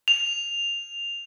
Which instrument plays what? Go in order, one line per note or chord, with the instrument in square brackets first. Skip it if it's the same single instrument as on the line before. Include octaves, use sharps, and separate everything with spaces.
[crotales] F7